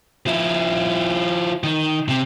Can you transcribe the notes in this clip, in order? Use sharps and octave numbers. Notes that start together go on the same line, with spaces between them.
F3 E4
D#3
C3